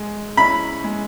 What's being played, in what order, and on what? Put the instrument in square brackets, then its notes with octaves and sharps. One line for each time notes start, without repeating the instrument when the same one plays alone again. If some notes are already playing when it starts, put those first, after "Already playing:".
Already playing: [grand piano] G#3
[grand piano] C#4 E4 [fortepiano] B5
[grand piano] G#3